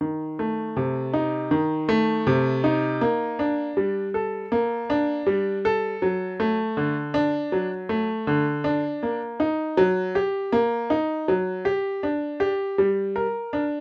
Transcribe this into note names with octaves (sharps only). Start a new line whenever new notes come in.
D#3
A3
C3
D#4
D#3
A3
C3
D#4
A#3
D4
G3
A4
A#3
D4
G3
A4
F#3
A3
D3
D4
F#3
A3
D3
D4
A#3
D#4
F#3
G4
A#3
D#4
F#3
G4
D4
G4
G3
A#4
D4